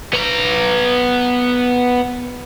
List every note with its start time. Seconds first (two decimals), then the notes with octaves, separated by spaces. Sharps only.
0.13 B3 A#5